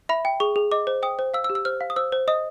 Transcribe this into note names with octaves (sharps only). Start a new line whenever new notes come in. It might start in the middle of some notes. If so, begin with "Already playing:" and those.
E5 B5
G5
G#4 C#6
G#4
D#5 D6
C5
G5 D#6
C5
F5 E6
E6
G4
E6
C5 F6
F5
D#6
C5 E6
C5
D#5 D#6